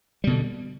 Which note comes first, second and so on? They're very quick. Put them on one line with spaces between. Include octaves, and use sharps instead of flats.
G3 B2 D3